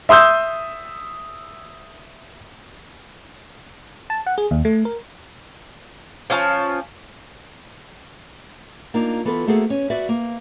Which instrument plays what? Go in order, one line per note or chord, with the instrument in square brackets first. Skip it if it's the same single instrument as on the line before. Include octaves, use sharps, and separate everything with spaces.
[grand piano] E5 C6 D#6 E6 G6
[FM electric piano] A5
F#5
G#4
D#2
A3
A#4
[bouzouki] F3 C#4 F4 A5
[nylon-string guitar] A#3 D4 D#4 F4
E3 B3 F4 A4 B4
A3 A#3 F#4 G#4 A4
C#4
F#4 B4 D5 E5
A#3